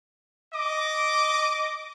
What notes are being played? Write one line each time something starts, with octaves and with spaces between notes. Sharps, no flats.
D#5 D6